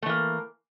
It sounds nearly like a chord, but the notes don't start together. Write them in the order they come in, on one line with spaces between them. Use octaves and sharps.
A3 E3 A#3